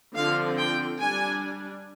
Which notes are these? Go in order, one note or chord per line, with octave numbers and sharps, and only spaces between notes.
D3 F3 C4 F5
G5
G3 D4 G#5